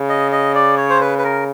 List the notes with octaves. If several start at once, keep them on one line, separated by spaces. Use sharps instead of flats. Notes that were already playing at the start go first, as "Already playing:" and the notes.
Already playing: C#3
D#5
D#5
D5
C#5
C5
B4
B4
A#4